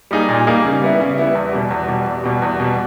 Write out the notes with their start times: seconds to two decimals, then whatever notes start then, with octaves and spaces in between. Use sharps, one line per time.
0.11 G3 A#3 D#4 G#4
0.29 A#2
0.47 G3 A#3 D#4 G#4
0.64 C#3
0.82 G3 B3 E4
1.00 C#3
1.18 G3 B3 E4
1.35 E2
1.53 B2 G3
1.71 E2
1.88 B2 G3
2.07 E2
2.24 B2 G3
2.42 E2
2.60 B2 G3